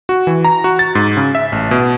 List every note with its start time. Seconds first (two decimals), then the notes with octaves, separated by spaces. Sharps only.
0.09 F#4
0.27 E3
0.44 A#5
0.64 F#4
0.79 A6
0.95 G#2
1.17 C#3
1.35 E5
1.52 A1
1.71 B2